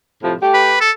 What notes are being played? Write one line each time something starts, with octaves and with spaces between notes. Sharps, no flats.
A2 C3 F3
A3 G4
B4
A4